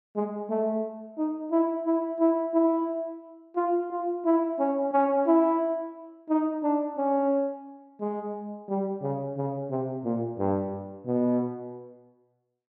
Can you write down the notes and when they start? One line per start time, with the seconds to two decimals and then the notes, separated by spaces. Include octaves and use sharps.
0.16 G#3
0.50 A3
1.18 D#4
1.51 E4
1.86 E4
2.20 E4
2.54 E4
3.56 F4
3.91 F4
4.25 E4
4.59 C#4
4.93 C#4
5.27 E4
6.29 D#4
6.63 D4
6.97 C#4
8.00 G#3
8.69 G3
9.02 C#3
9.37 C#3
9.70 C3
10.05 A#2
10.39 G2
11.07 B2